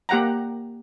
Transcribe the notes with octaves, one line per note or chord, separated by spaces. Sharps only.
A#3 G4 F#5 G5 A#5